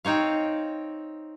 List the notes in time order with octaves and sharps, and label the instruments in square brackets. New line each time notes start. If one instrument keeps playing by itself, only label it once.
[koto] C4 D#4 C#5 F5